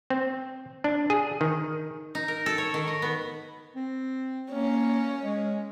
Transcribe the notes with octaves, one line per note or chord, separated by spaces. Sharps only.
C4
D4
G#4
D#3
D#4
A#4
A4
C#5
D#3
D#5
B3
C4
A#3 C#4
G#3